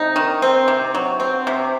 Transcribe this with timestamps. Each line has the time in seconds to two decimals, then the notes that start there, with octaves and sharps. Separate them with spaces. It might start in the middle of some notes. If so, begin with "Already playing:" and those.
Already playing: C3 D#4
0.16 D#3
0.42 C4
0.68 C3
0.94 F#3
1.20 C4
1.47 C3